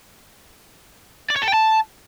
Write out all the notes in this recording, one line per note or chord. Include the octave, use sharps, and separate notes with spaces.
D5
C#5
A4
G5
A5